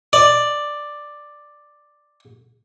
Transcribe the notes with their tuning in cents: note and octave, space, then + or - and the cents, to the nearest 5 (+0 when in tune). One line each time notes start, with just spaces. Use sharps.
D5 +5